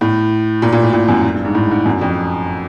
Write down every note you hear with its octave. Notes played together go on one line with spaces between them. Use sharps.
A2
A#2
A#2
A2
A#2
F#2
G2
G#2
A2
G#2
F#2
F2